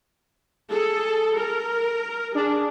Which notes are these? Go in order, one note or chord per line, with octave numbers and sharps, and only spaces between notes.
G#4 A4
A#4
D4 G#4